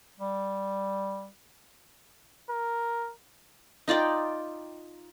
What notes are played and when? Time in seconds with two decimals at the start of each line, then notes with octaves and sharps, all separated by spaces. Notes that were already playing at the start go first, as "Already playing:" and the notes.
0.19 G3
2.50 A#4
3.88 D#4 F4 D5 G5